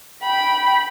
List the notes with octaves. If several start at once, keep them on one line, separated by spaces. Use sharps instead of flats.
G5 B5